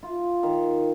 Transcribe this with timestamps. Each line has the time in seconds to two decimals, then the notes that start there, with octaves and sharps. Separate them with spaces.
0.03 F4
0.43 D#3